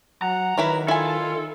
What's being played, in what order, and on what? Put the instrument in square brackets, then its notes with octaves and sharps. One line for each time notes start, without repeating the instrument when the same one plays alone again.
[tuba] F#3 [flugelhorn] F#5 [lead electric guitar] A#5
[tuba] D#3 [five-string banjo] F#3 E4 B4 [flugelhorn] A#4
[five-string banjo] E4 G#5 [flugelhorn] F4 [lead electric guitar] A4